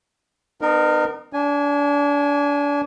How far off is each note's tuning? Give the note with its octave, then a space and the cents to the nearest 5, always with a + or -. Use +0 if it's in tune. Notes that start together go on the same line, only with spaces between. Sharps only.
B3 +20 D#4 -40 A#4 +0
D4 -30 G#5 +0